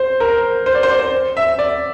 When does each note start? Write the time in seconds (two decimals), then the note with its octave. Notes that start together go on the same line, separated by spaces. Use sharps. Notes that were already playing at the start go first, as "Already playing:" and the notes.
Already playing: C5
0.20 A#4
0.66 C5
0.75 D5
0.83 C5
0.90 D5
0.99 C5
1.37 E5
1.59 D5